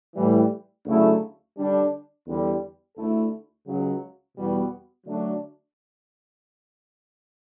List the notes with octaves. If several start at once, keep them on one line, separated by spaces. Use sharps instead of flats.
A2 E3 G3
D2 C#3 F#3 A3 E4
D3 G3 D4
E2 D3 G3
D2 D3 A3 E4 A4
C#2 C#3 F#3
E2 B2 G3 B3 F#4
D3 F#3 A3 D4